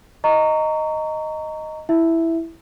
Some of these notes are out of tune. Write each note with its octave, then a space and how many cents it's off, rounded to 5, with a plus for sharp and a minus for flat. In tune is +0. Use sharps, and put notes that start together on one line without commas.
D#5 +0 A#5 -20 C#6 +20
E4 +0 E5 +0